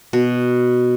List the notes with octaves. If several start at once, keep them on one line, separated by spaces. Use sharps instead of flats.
B2